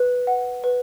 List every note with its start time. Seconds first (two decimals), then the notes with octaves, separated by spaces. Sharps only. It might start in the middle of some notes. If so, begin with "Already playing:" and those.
Already playing: B4
0.27 F#5
0.64 B4